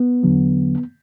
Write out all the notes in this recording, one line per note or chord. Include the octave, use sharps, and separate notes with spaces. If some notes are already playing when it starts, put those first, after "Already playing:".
Already playing: B3
E2 D3 F#3